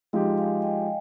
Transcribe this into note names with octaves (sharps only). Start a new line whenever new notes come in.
F3 G#3 D#4 G4 D#5 G5
F5 G#5
D#5 G5